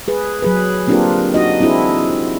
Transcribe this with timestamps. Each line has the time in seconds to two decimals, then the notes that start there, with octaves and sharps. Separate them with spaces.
0.08 G#4 B4
0.42 F#3 G#4 B4
0.87 A#3 C4 D4 F4 G4 A#4
1.34 D#4 F#4 D#5
1.61 C4 D4 E4 G#4